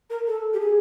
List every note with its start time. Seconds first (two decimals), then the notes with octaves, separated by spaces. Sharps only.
0.10 A#4
0.27 A4
0.54 G4
0.60 G#4